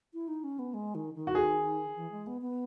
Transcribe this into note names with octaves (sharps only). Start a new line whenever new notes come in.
E4
D#4
C#4
B3
G#3
D#3
D#3
F#4
G#4
E3
G#3
B3
B3